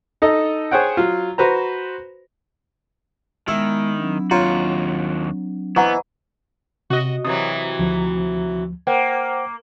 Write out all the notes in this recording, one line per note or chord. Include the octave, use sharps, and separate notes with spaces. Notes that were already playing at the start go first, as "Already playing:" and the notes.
D#4 A4 D#5
G#4 C5 C#5 F#5 G5
F#3 F4
F#4 B4 C5 A#5
D#3 G#3 B3 E4
F#3 C4 D4
D#2 F4 F#4 C#5 A#5
E3 B3 C5 D#5 F#5 A#5 B5 C#6
C3 F#4 D#5
C3 E3 F#3 D#6
D2 F3
A#3 C5 F#5 G5